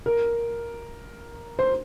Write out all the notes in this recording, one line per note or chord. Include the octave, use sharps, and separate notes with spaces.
A#4
C5